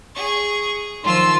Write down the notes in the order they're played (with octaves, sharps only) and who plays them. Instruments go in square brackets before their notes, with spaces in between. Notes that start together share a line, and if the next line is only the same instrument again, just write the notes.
[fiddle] G#4 C#6
[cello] D#3 F3 [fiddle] F4 E6 [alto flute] C6